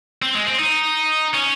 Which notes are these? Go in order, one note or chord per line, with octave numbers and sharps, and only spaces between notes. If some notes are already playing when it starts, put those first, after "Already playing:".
C4
G#3
C4
D#4
C#4